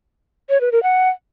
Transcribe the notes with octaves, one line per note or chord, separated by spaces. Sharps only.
C#5
B4
A#4
F#5